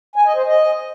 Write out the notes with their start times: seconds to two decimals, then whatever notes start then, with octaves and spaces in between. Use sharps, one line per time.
0.16 G#5
0.26 D#5
0.36 C5
0.46 D#5